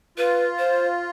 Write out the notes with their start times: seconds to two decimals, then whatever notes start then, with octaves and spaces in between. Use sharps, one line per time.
0.18 F4 B4
0.59 C5